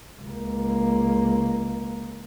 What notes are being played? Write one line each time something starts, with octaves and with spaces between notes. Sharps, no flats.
C#2 A#3